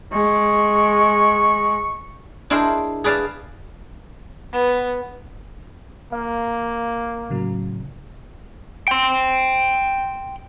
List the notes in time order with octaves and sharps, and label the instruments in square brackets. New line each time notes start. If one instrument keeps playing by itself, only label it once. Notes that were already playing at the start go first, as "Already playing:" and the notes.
[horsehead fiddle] G#3 [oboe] C#6
[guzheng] D4 E4 G#4 A#4 C5 D#5
G#4 B4 D5 F5 A5
[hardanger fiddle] B3
[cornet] A#3 [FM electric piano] F5
[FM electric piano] A2 C#3 F#3
[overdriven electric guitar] G5 C6